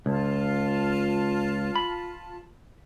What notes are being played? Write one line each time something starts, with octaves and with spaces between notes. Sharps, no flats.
C#2 F4 A5
B5